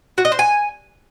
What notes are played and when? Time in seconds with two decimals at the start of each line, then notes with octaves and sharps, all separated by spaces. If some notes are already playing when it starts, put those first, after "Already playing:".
0.18 F#4
0.25 D#5
0.32 C5
0.39 G#5